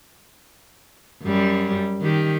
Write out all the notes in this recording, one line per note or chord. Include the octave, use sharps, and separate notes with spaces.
F#2 G3
D#3 G4